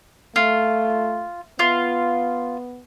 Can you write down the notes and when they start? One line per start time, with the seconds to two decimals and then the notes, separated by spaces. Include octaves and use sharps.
0.36 A3 F4
1.59 B3 F4